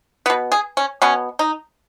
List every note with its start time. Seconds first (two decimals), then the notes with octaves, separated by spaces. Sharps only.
0.26 B2 B3 B4
0.52 G#4
0.77 C#4
1.02 B2 B3 C#4
1.39 D#4